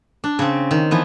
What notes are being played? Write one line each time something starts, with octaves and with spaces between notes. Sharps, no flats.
D4
C#3 C4
D#3
E3 F3 B3